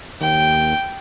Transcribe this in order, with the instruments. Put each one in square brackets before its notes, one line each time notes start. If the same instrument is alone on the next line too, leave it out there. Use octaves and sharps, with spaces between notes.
[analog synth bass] D#2 [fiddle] G5